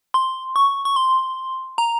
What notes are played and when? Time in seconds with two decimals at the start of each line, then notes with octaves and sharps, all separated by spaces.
0.14 C6
0.56 C#6
0.85 C#6
0.96 C6
1.78 A#5